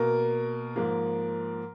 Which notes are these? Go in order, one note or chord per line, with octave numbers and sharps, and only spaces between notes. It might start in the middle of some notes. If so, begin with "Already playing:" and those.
Already playing: B2 A#3 A#4
G#2 F3 A#3